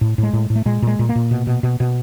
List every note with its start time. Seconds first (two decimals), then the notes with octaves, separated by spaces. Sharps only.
0.01 A2
0.18 A2
0.23 G#3
0.33 A2
0.50 A2
0.56 A3
0.66 A#2 G#3
0.82 A#2 G#3
0.99 A#2
1.09 A#3
1.15 A#2
1.31 B2
1.47 B2
1.63 B2
1.80 B2